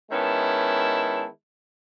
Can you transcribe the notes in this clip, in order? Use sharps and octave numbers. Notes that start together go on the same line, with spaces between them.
D#3 G#3 B3 C#4 E4 A5